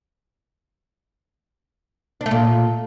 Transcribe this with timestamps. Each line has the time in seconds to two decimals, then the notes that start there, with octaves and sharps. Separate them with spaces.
2.21 D4
2.26 A3
2.31 A#2